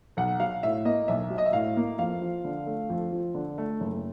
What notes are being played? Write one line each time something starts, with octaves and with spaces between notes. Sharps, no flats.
B1 F#5
F#3 F5
A2 E5
A#3 D#5
B1 E5
F#3
D#5
E5
A2 F5
A#3
F2 F5
F3
D3
A3
F2
F3
D3
A3
F#1